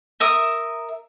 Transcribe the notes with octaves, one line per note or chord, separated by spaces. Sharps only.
A#4 E5 D#6